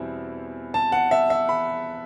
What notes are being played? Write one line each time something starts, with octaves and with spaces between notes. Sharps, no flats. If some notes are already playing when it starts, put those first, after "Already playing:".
Already playing: E2 B2 G3 C4 E4
A5
F#5
E5
E5
B5